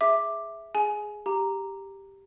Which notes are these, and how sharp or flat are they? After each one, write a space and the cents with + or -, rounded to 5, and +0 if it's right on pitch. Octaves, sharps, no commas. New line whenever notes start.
G#4 +0 E5 +0 D6 +5
G#4 +0 G#5 +15
G4 +0 A#5 +0